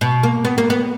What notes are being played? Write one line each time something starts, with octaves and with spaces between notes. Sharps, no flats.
B2
A#3
B3
A#3
B3